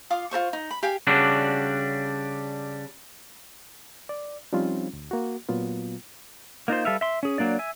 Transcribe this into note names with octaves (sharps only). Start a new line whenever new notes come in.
F4 F5 D6 D#6
F4 A#4 C5 C#6
D#4
B5
G4 F5 G5 G#5
C#3 G3 D4 F#4
D5
F3 G3 C4 C#4 D#4 F4
D2
A#3 F#4
A#2 F#3 B3 F4
A#3 D#4 F4 C5
G3 A4 B4 E5 F5
E5 C6
C#4 G#4
F#3 A#3 D4 D5
E5 G#5